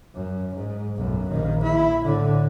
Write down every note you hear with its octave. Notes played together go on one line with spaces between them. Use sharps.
F#2
G#2
B1 F#2
A#1 D#3
E4
A2 D3